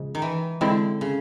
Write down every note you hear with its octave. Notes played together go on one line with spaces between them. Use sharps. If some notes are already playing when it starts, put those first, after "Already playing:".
Already playing: C#3 F3 G#3
D#3
E3
D3 G#3 C4 E4
C#3